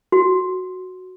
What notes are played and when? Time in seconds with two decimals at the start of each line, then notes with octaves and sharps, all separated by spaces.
0.12 F#4